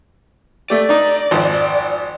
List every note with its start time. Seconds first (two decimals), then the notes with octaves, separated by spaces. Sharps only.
0.70 A3 G4 D5
0.89 D4 D#4
1.31 G#1 F2